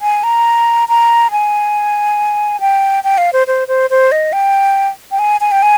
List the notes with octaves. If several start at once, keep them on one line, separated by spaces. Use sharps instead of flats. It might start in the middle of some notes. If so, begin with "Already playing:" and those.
G#5
A#5
A#5
G#5
G5
G5
F5
C5
C5
C5
C5
D#5
G5
G5
G#5
G#5
G5
G#5